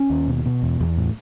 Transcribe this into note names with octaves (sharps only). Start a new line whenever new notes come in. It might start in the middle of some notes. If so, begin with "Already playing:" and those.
Already playing: C#4
D#2
B2
B2
E2
E2
A2